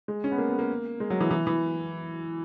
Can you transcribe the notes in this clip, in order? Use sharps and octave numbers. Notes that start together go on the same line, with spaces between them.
G#3
C#4
B3
A#3
B3
A#3
G#3
F#3
E3
E3
E3